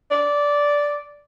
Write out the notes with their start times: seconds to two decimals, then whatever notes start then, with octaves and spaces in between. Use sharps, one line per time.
0.11 D5